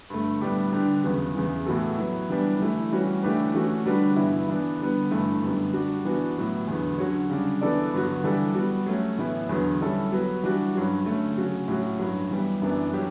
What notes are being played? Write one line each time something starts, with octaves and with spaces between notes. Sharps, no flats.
G2 D3 A3
A2 G3 B3 D4 G4
D3 G3 D4 G4 B4
E2 C#3 F#3 B3
E2 C#3 E3
A2 E3 B3 F#4 A4
F#3 B3 E4
E3 G3 B3 D4 G4
E3 A3 E4
E3 G3 C#4 F#4
E3 A3 D4 G4 B4
E3 A3 C#4 F#4
D3 G3 D4 F#4 B4
G2 E3 B3 E4
E3 B3 D4
D3 G3 B3
G2 E3 A3
F#2 D3 G3 B3
G3 D4 F#4
E3 B3 D4 F#4
A2 F#3 B3
E2 D3 F#3 B3
D3 F#3 C#4 F#4 C#5
C#3 G3 D4
E3 B3 D4 A4 D5
G2 D3 F#3 B3 F#4
E3 G3 D4 A4
G3 B3 F#4
F#3 A3 C#4
A2 E3 B3 E4
E2 D3 F#3 B3
G3 C#4 E4 A4
F#3 B3 F#4 B4
E3 G3 D4 F#4
G2 F#3 C#4 F#4
D3 A3 C#4
C#3 F#3 C#4 F#4
A2 F#3 C#4 F#4
G2 F#3 C#4
E3 G3 B3
F#2 E3 B3 D4
F#3 C#4 G4